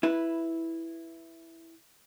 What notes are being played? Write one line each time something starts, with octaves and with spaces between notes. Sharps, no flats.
E4 B4